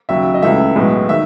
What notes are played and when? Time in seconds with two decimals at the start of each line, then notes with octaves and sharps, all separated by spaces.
0.09 D#2 C#3 F#3 E5
0.34 D#5
0.42 C#2 C#3 E3 A3 E5
0.76 B1 A2 G#3 B3
1.09 D#3 E5